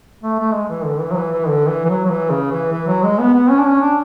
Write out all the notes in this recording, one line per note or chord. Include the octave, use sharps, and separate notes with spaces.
A3
A3
G#3
E3
D3
E3
F#3
E3
E3
D3
E3
E3
F#3
F#3
E3
C#3
E3
E3
F#3
G#3
B3
B3
C#4
D4
C#4
D4